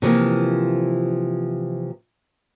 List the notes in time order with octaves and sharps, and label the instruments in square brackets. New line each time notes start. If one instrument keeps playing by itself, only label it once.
[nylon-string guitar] C3 E3 F3 A#3